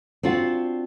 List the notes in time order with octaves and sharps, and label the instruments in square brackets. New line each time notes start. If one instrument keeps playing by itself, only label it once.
[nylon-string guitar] C4 D4 F4 F#4